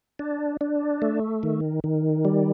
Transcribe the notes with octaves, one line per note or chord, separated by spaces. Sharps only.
D4
D4
A3
D#3
D#3
G3